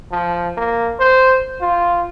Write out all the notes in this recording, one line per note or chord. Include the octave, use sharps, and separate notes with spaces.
F3
A#3
C5
F4